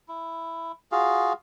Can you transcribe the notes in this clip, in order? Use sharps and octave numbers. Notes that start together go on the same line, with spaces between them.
E4
F4 F#4 G#4 F5